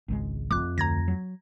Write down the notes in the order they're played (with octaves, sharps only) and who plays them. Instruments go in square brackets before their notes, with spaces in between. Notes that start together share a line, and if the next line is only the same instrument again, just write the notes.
[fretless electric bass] G#1 C#2 G#3
[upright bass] F2 A3 [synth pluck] D6 F#6
[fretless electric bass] D2 [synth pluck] A#5 G#6 A#6
[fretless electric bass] F#3